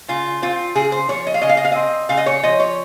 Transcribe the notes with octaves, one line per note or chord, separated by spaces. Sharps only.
C#3 F4
C4 F4
C#3 G#4
C5
F3 C#5
D#5
F5
C#3 D#5
F5
D#5
F5
C4 D#5
C#3 F5
D#5
C#5
F3 D#5
C#5